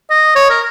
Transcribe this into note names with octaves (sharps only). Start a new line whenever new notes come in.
D#5
C#5
A#4